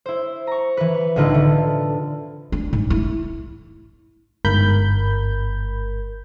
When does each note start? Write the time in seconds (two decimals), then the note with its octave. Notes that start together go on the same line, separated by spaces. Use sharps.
0.06 E4 C5
0.47 A#5 C#6
0.77 E3 B4
1.16 C2 A2 D3 D#4 F4 B4
1.34 D3
2.52 D4
2.73 G#2
2.90 E4
4.45 G1 G#2 A#4 B5 G6